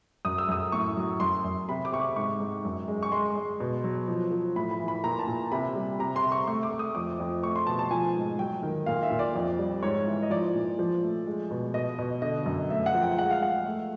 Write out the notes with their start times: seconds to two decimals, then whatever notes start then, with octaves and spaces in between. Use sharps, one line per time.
0.25 F#2 D#6
0.38 E6
0.48 F#2 D#6
0.72 A2 C#6
0.97 F#3
1.20 F#2 C6
1.44 F#2
1.69 C3 B5
1.85 D6
1.92 C3 C#6
2.00 D6
2.16 G#2 C#6
2.40 G#2
2.65 F#2
2.88 G#3
3.03 C#6
3.12 G#3 C6
3.36 G#3
3.60 B2
3.84 F#3
4.08 F3
4.32 F3
4.56 A2 B5
4.71 B5
4.80 E3
4.88 B5
5.04 A#2 A#5
5.19 A5
5.28 A#2
5.52 C3 B5
5.75 G3
5.99 C3 A#5
6.16 C6
6.23 C3
6.32 C#6
6.47 A3 C#6
6.63 D6
6.71 A3
6.79 D#6
6.95 F2 D6
7.20 F2
7.43 A3 C#6
7.56 C6
7.67 B2 A5
7.79 A5
7.91 F3 G#5
8.15 G#2
8.39 F#3 G5
8.63 D#3
8.86 A#2 F5
9.03 E5
9.11 A#2
9.19 D5
9.35 F2
9.58 G3
9.83 G#2 C#5
10.07 E3
10.23 D#5
10.30 F3 D5
10.54 A#2
10.79 F3
11.03 A3
11.27 G#3
11.51 B2
11.74 B2 D#5
11.99 B2
12.22 D3 D#5
12.46 F#2
12.70 A3 E5
12.86 F#5
12.94 F3
13.02 G5
13.18 G#3 F#5
13.31 F5
13.42 G#3 F#5
13.66 A3